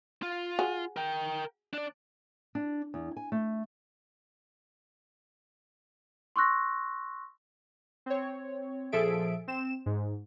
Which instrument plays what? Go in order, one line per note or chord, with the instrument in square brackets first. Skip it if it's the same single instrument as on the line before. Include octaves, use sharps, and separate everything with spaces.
[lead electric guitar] F4
[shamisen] F#4 G#4
[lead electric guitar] A#4 G5
D4 D5
[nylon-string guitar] D4
E2
G#5
A3
[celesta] C6 C#6 E6 F#6 A#6
[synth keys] C4 C#5
A#2 F3 G#4 A4 E5 D7
C4 E7
G#2